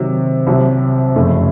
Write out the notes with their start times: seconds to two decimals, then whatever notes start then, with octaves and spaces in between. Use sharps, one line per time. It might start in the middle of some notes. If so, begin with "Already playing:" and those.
Already playing: C3 D#3 F#3
0.47 C2 C3 F#3
1.16 F#1 F2 C#3 A3